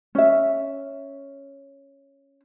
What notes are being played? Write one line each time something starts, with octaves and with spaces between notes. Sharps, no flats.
C#4 E5